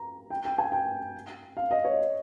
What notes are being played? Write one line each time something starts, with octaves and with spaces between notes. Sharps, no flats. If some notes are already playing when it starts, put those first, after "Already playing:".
Already playing: A#5
G5
G5
G#5
G5
F5
D#5
C#5